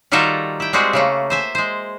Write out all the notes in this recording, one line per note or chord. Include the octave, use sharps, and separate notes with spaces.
D#3 G3 F4 F#4 A4 A#4
E4 G5
G3 G#3 C4 F#4 G#4
C#3 A3 A#3
C5 E5 G#5
G#3 C5